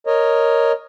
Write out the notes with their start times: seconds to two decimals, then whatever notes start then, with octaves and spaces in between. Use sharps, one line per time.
0.07 A#4 C#5 D#5